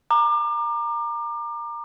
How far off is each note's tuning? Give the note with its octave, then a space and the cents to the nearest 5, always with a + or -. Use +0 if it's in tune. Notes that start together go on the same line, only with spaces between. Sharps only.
A#5 +0 D6 +30